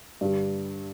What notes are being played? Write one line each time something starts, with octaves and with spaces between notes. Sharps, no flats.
G2 D3 G3